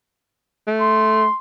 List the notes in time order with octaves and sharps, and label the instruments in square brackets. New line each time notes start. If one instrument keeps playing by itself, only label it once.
[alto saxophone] A3
[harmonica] C6